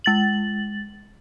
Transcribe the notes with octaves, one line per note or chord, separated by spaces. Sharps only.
G#3 A6 F#7